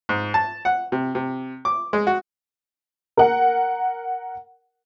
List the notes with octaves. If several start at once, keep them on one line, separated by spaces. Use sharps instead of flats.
G#2
A5
F#5
C3
C3
D6
G#3
F#4
A#4 F#5